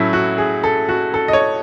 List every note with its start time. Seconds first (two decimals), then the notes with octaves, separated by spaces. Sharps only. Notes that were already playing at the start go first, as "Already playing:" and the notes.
Already playing: A2 F#3 A3 C#4 E4
0.13 F#4
0.38 G#4
0.64 A4
0.89 F#4
1.14 A4
1.28 D#5
1.33 C#5